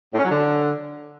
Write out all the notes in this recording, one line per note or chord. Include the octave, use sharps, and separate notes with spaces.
A2
C#4
F#3
D3